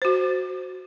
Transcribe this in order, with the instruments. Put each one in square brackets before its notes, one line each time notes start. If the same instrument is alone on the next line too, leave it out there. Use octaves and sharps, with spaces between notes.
[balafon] F#4 C5